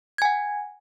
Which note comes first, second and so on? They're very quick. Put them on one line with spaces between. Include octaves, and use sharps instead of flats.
G#6 G#5 F#5